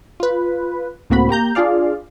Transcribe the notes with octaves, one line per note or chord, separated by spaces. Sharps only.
F4 B4
C#2 A2 A#3 C4 F#4 B5
A#3 G4 A#5 G6
D4 F4 G#4 D5 F5